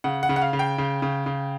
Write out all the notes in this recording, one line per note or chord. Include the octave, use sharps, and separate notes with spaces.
C#3 F#5
F#5
C#3
F#5
F5
C#3
G5
C#3
C#3
C#3